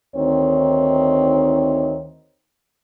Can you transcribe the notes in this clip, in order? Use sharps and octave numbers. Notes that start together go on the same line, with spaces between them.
D2 D#3 C4 D#4 C#5